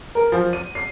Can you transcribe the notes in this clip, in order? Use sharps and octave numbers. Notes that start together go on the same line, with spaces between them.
A#4
F3
D#7
C7